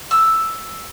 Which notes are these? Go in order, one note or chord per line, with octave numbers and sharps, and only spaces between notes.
E6